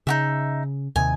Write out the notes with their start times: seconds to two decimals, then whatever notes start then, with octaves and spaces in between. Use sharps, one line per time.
0.07 C#3 D#4 F#4 E5
0.96 D#2 C3 D#3 G#5